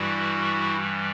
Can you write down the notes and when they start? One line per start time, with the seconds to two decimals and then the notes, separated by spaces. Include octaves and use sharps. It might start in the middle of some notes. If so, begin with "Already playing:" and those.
Already playing: G2 E3 G3 E4 F#4